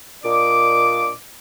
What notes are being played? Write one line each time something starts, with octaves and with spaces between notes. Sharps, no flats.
A#2 A#3 D4 D5 D#5 D6